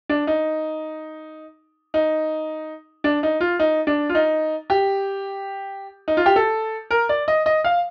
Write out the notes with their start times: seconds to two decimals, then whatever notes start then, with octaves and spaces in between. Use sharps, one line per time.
0.09 D4
0.27 D#4
1.94 D#4
3.04 D4
3.23 D#4
3.41 F4
3.59 D#4
3.87 D4
4.09 F4
4.15 D#4
4.70 G4
6.08 D#4
6.17 F4
6.26 G4
6.36 A4
6.91 A#4
7.09 D5
7.28 D#5
7.46 D#5
7.64 F5